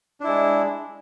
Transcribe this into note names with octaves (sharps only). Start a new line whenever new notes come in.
G#3 D4 E4